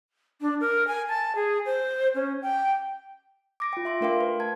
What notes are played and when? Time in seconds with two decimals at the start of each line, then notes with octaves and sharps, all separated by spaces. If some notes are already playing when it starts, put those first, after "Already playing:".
0.41 D4
0.61 A#4
0.87 G#5
1.08 A5
1.35 G#4
1.66 C5
2.15 C#4
2.42 G5
3.60 D6 A#6 D7
3.73 F4 G5
3.85 E5 C6 D7
4.01 A3 D4 A#4 F5 G5 C6
4.21 B4
4.40 A5 G#6